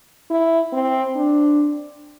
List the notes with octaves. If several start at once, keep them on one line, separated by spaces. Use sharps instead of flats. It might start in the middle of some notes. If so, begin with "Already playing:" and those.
E4
C4
D4